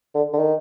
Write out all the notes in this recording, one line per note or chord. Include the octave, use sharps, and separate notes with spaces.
D3
D3
D#3